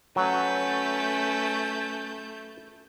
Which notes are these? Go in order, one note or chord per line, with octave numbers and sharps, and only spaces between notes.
F#3 A3 C#4 B4 G6